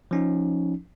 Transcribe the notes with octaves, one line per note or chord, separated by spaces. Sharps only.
F3 C#4 D#4